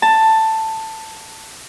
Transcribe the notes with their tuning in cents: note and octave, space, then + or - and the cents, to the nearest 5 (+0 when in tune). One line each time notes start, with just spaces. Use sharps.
A5 +10